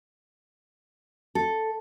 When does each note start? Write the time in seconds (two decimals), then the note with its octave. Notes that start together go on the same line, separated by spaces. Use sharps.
1.35 A4